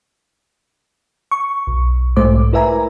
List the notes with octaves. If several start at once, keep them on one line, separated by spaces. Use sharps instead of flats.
C#6
B1
B1 G#2 A3 C5 D6
E4 A#4 B4 E5 G#5 A#5